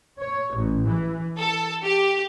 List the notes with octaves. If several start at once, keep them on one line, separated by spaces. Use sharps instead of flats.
C#5
A1
E3
A4
G4